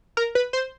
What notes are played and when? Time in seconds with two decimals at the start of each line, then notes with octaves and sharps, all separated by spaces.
0.17 A#4
0.35 B4
0.53 C5